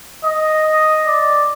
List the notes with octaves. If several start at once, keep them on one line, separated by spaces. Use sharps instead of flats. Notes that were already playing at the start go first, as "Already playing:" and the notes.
D#5
D5